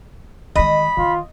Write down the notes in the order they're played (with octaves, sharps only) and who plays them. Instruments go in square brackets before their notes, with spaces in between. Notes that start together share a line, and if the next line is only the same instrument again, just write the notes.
[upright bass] D#3 G#3 [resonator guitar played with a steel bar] D#5 [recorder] B5
[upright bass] D#3 [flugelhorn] F4